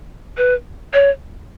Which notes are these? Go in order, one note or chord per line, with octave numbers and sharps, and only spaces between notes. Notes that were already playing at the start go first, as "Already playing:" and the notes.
B4
C#5